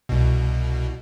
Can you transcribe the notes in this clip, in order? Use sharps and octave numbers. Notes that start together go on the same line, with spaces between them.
C2 B2